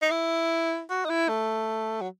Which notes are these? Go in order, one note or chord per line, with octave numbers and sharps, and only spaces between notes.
D#4
E4
F#4
D#4
E4
A3
F#3